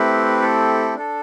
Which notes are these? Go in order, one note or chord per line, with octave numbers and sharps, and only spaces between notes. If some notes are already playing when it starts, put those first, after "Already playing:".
Already playing: A3 C4 E4 G4 B4
A4
D4 A4